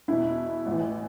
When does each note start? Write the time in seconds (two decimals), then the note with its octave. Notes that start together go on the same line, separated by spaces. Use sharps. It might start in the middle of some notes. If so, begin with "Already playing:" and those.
0.08 E2 B2 E4
0.66 A1 A2 E3